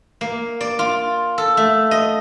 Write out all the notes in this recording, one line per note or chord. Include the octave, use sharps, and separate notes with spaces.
A#3
D5
F4
A4
A3
D#5